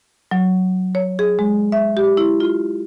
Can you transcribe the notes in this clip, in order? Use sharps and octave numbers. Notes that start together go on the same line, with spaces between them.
F#3
C#5
G#4
G#3
E5
G4
E4
F4